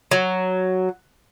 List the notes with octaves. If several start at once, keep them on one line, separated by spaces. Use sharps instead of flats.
F#3